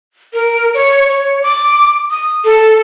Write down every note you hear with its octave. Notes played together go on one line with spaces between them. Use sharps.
A#4
C#5
C#5
D6
D#6
A4